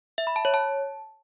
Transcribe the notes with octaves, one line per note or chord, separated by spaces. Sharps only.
E5
B5
A5
C#5
A5